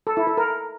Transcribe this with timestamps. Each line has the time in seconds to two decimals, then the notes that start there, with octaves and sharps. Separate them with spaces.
0.07 A4
0.17 E4
0.27 A4
0.37 A#4